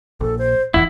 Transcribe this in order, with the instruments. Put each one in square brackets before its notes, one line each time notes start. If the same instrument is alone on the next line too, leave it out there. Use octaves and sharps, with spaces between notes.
[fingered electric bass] A#1 A#2 [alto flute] A4
[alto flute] C5
[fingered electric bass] D#1 F2 E3 [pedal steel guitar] E4 [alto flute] F#5